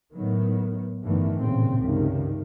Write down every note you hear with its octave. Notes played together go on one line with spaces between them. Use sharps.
A2 D#3 F#3 B3
G1 G2 D#3 E3 A3 B3
A1 G2 A#2 C#3 C4
C#2 G2 C3 D#3